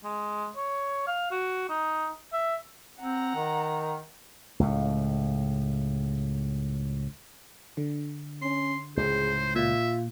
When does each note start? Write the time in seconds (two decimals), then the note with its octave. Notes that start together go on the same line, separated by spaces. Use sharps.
0.04 G#3
0.56 C#5
1.07 F5
1.31 F#4
1.69 D#4
2.33 E5
3.00 C4 F#5 A#5
3.35 D#3
4.60 C#2 A2
7.77 D3
8.42 C#4 C6
8.97 C#2 A2 G#4 C5
9.55 A#2 F4 E5